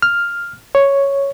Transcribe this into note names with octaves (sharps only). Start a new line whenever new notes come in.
F6
C#5